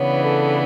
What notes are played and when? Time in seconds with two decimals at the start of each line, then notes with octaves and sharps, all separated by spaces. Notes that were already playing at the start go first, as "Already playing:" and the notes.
Already playing: C#3 E3 B3 D4 C#5
0.23 A4